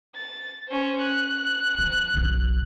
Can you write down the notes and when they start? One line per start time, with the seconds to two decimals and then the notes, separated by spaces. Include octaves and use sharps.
0.15 A6
0.68 C#4 C5
1.01 F#6
1.79 F3
2.14 F#1 B1